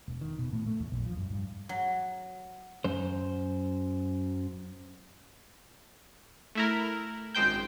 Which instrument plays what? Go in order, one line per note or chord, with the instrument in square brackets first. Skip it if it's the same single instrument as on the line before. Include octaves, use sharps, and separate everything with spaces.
[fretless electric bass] E1
D#3
B2
A2
A3
E2
A#1
F3
F#2
G2
[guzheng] F#3
[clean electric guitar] F#2 C5
[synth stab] A3 E4 A#4
G#1 F#2 G#3 C5 G5 G6